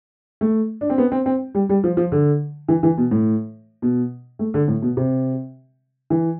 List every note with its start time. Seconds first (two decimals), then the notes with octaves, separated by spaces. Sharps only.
0.41 A3
0.81 D4
0.90 C4
0.98 B3
1.12 C4
1.26 C4
1.55 G3
1.69 G3
1.84 F3
1.97 F3
2.12 D3
2.69 E3
2.83 E3
2.98 B2
3.11 A2
3.82 B2
4.39 A3
4.54 D3
4.68 A2
4.82 B2
4.97 C3
6.10 E3